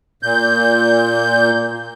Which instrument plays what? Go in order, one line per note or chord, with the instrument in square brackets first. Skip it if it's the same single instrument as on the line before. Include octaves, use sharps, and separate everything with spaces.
[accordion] A#2 G6